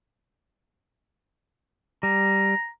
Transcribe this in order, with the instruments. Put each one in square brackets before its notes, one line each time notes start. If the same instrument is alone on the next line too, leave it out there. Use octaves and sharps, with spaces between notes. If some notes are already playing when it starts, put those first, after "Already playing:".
[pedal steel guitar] G3 [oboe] A#5